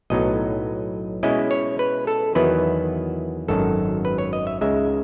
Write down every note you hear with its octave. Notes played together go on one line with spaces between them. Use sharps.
B1 A2 F#3 B3 D#4 D#5
B2 G#3 C#4 E4 D#5
C#5
B4
A4
E2 D#3 F#3 B3 E4 B4
G#1 F#2 D#3 F#3 A4
B4
C#5
D#5
E5
C#2 C#3 G#3 D#4 E5